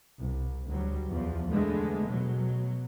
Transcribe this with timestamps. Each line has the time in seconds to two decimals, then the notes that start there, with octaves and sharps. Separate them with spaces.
0.19 C2
0.69 D2 F#3 G3
1.11 E2 F3
1.51 D3 G#3 A3 B3
2.09 B2 F#3